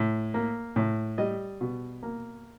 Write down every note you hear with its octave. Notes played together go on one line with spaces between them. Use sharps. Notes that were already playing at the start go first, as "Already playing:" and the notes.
Already playing: A2
A#3
A2
G3 D#5
B2
A#3